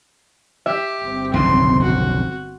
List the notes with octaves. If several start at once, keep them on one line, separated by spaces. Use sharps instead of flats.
G4 E5
G1 C4
B1 F2 C#3 C6
F#4